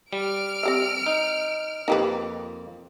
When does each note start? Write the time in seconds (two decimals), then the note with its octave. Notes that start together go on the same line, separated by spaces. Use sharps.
0.13 G3 F6 D7
0.63 C4 G4 E5
1.06 D#4
1.88 F2 A#3 D#4 G4 B4